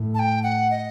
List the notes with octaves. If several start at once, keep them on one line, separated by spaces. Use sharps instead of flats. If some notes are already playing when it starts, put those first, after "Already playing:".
Already playing: A2
A5
G5
F#5
D#5